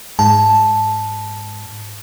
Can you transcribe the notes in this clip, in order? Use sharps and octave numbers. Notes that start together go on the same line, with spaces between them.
G#2 A5